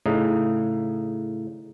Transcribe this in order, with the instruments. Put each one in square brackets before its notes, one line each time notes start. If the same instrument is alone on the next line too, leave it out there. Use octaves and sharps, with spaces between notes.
[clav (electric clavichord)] A2 C#3 D#4